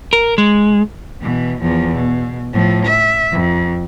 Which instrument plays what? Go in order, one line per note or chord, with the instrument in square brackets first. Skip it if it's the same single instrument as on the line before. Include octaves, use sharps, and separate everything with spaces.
[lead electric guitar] A#4
G#3
[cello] B2 E3
E2 F3
B2
A2 F3
E5
F2